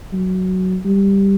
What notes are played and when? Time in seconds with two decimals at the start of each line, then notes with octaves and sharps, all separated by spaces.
0.13 F#3
0.85 G3